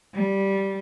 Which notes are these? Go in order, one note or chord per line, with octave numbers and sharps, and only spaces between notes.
G3